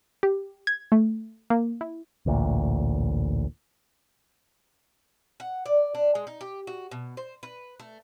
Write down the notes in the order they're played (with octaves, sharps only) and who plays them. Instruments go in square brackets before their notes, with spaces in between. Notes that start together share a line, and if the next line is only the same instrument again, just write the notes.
[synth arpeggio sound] G4
G#6
A3
A#3
E4
[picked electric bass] A1 D2 A#2
[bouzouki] F#5
D5
D4
G#3
D#4
G4
F#4
B2
C5
B4
A3